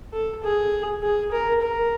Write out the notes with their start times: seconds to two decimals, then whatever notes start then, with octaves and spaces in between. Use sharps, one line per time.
0.13 A4
0.43 G#4
1.03 G#4
1.32 A#4
1.61 A#4